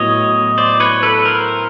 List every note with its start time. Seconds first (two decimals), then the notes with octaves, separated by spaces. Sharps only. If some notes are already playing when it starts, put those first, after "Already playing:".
Already playing: A2 F#3 B3 E4 C#5 D#5
0.58 C5 D5
0.80 B4 C#5
1.03 A4 B4
1.25 A#4 C5